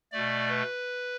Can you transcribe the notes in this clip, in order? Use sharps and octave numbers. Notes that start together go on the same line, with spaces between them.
B2 A3 D5
B4